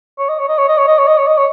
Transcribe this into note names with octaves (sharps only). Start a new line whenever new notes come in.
C#5
D#5
C#5
D#5
C#5
D#5
C#5
D#5
C#5
D#5
C#5
D#5
C#5